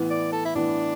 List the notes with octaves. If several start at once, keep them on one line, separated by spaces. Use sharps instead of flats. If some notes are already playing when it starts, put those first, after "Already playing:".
Already playing: A2 E3 B3
D5
A4
E4
A2 E3 B3 D4